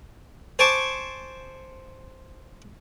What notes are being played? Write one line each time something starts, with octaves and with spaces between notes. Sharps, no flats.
C5 G#5 A5 C#6 D6